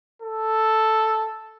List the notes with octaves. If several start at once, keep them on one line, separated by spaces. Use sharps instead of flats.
A4